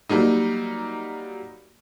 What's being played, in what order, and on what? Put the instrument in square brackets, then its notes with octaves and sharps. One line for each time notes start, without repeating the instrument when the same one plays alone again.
[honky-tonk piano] F#3 G3 A#3 D#4